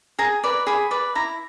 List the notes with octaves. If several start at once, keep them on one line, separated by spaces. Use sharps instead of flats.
G#4 A#5
B4 D5
G#4 B5
B4 D5
E4 A#5